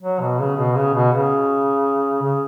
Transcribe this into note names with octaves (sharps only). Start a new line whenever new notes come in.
F#3
B2
C#3
B2
C#3
B2
C#3
C#3